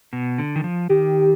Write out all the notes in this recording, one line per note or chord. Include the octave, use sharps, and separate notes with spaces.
B2
D3
D#3
F3
D#3 G4